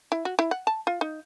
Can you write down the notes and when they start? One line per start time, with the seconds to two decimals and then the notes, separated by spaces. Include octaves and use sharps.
0.12 E4
0.25 F#4
0.39 E4
0.51 F#5
0.67 A5
0.87 F4
1.01 D#4